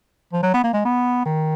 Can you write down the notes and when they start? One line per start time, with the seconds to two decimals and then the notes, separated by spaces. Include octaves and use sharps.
0.33 F3
0.43 F#3
0.54 B3
0.64 A#3
0.74 G#3
0.85 B3
1.25 D#3